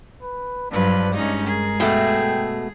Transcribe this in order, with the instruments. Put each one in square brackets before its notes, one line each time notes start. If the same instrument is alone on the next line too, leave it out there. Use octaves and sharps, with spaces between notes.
[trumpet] B4
[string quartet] G2 F3 B4 [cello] F#3 [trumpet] D4
[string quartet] G2 C#4 D#4 [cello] G#3
[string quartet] G#4 [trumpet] A#4
[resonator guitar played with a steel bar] B2 A3 [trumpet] G5